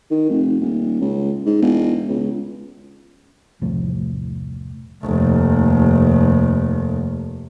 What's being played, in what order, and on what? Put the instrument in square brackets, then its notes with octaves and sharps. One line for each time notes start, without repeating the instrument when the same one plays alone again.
[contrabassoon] D#3
F1
D#1
C#2
G#2
E1
C#2
[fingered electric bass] E1 C2 A2 F3
[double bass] F1 D#2